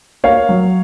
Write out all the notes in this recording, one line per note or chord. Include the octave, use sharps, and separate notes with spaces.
A#3 C#5 F5
F#3